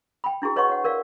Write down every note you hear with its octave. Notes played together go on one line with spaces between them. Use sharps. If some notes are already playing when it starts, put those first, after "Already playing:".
G5 B5
D4 E4 F#4 G#4
B4 C#5 D#5 F#5 C6 C#6
C#5 F#5
A#4 D5 F5